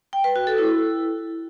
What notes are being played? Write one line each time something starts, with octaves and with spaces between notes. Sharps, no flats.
G5
B4
F#4
A4
E4